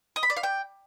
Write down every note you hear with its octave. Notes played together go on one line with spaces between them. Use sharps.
D#5
B5
D5
F5
G5